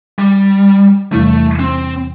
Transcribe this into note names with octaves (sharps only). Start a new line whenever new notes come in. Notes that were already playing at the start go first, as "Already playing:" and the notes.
G3
E2 C3 E3 G3 A3 E4
C4